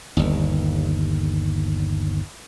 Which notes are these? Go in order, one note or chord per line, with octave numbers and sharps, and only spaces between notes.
G1 D#2